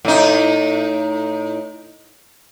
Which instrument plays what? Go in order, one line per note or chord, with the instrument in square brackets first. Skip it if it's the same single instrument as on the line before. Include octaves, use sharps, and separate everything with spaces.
[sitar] A2 D#4